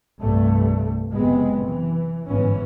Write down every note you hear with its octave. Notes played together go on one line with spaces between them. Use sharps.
C2 G2 A3
F#1 F#2 C3 G#3 B3
E3
G1 G#2 E3 B3 C#4